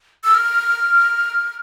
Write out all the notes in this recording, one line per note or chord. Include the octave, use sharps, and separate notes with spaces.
E6
F6